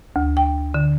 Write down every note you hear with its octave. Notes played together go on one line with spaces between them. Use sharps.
D2
G5
D3